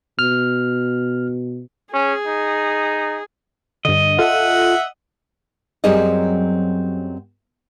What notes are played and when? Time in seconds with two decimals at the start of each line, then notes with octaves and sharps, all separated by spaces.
0.19 B2 F6
1.94 C#4 G#4
2.27 D#4
3.85 G2 D3 D#5
4.19 F4 A4 E5 F#5
5.84 F#2 F#3 G3 C4 G#4 D#5